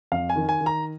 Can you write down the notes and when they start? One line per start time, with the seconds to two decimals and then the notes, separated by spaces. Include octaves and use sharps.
0.12 F2 F5
0.30 G#5
0.36 D#3
0.49 G#5
0.61 D#3
0.66 A#5